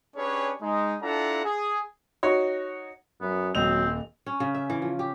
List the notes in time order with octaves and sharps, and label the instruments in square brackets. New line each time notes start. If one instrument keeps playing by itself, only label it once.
[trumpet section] C#4 D4 G4 G#4 B4 C#5
G#3 D#4
D4 E4 F4 A4 F#5 A#5
G#4
[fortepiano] D#4 F#4 C#5
[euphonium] F#2 [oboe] B3
[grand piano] D#1 D#5 F7 [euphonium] F#3 [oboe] C4
[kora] C#4
C#3
E5
E3
F3
G4